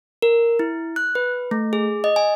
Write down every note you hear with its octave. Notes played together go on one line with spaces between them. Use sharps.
A#4
E4
F#6
B4
A3
G#4
D#5
G#5